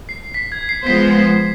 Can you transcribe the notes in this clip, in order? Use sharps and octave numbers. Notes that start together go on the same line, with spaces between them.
C7
B6
G#6
C7
F3 G#3 B3 F4 C5 B6